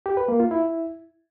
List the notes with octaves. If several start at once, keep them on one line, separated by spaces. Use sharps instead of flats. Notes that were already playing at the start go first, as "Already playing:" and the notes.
G4
B4
A#3
F4
E4